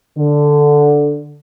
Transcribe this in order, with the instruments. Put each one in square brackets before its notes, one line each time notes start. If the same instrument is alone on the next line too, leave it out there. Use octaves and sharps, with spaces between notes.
[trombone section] D3